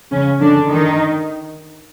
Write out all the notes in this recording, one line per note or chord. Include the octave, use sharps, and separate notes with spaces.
C#3 C#4
D3 D4
D#3 D#4